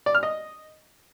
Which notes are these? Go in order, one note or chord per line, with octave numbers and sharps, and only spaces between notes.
D5
F6
D#5